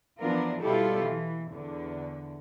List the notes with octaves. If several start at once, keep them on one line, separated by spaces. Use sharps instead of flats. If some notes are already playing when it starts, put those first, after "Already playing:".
E3 F3 B3 D4 F4 A#4
B2 G3 E4 F4 G4 A4
E3
E2 D3